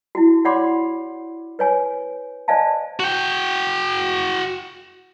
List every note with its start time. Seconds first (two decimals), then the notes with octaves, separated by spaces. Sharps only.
0.15 E4 F#4
0.45 C#5 D5 F#5 B5 C6 D6
1.59 B4 C#5 G#5
2.48 C5 D5 D#5 F5 G#5 A5
3.00 F#4 G5